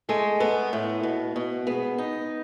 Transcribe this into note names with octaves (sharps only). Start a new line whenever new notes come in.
G#3 A3 A4
A3 B3 A4
A2
B2
B2
G#3 B3 G#4
D#4